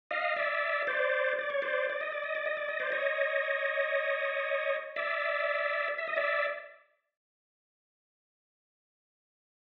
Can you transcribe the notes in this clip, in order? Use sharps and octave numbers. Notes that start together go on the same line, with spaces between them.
D#5 F5
D5 E5
C5 D5
D5
C#5
C5 D5
D5
D#5
D5
D#5
D5
D#5
D5
D#5
C5 D5
C#5 D#5
D5 E5
E5
D#5
D5 E5